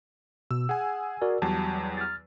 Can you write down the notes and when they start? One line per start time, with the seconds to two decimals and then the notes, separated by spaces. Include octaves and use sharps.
0.51 B2 E6
0.69 G#4 F#5 G#5
1.22 F#4 A#4 D5
1.42 E2 F#3 G3 A5
1.97 F6 A6